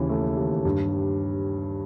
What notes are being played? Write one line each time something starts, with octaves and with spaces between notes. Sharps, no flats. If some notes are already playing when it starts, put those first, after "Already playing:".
Already playing: D#2 C#3 E3
A3
D#2
G2